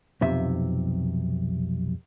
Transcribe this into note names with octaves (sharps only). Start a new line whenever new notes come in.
B1 F2 C3 E5